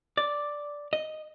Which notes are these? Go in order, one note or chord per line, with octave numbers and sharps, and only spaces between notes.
D5
D#5